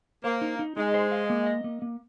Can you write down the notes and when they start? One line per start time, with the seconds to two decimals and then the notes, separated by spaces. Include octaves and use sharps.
0.23 A#3 C5
0.42 D#4
0.59 D#4
0.77 G#3 D#4
0.94 C5
1.12 F5
1.30 A#3
1.47 D#5
1.64 A#3
1.82 A#3